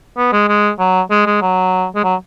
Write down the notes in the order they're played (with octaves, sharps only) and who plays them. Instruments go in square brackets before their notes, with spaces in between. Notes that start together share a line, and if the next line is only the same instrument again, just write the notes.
[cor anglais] B3
G#3
G#3
F#3
G#3
G#3
F#3
G#3
F#3